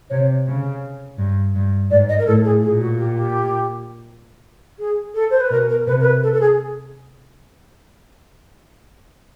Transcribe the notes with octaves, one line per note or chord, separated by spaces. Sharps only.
C3 C#5
C#3
G2
G2
G#2 D5
D#5
A#4
A2 A4
G#4
A#2 G#4
F#4
G4
G4
G#4
A4
C5
B4
B2 A#4
A#4
C3 B4
A#4
B4
A4
A4
G#4